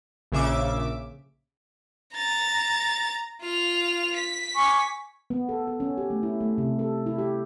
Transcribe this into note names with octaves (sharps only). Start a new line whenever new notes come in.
A#1 C#3 E5 D6
A#5 A6
F4 F7
B6
G#5 C#6 D6
B3
A4
A4
C#4
G4
A3
E4
A3
C3
A4
E4
G4